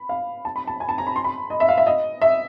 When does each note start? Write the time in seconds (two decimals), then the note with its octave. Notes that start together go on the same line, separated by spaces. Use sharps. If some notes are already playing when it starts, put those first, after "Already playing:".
Already playing: B5
0.09 F5
0.45 A5
0.56 B5
0.67 A5
0.80 G#5
0.89 A5
0.98 A#5
1.07 B5
1.16 C6
1.24 B5
1.50 D#5
1.60 E5
1.68 F5
1.78 E5
1.87 D#5
2.22 E5